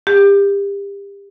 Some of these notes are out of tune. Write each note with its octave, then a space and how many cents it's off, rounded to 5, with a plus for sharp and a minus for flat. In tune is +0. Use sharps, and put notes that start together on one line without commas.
G4 +30